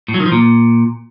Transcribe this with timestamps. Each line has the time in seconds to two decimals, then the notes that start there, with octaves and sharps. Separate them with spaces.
0.08 A2
0.14 F#3
0.20 D#3
0.26 F3
0.32 A#2